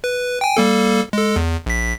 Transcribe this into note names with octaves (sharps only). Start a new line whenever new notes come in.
B4
G5 G#5
G3 A#3 A4
G#3 A4
E2
A#1 B6